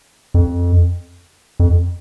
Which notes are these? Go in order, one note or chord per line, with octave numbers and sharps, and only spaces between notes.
F2
F2